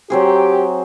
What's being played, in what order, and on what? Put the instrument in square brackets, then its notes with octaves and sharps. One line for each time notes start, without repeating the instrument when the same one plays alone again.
[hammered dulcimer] F#3 C4 G#4 [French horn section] G4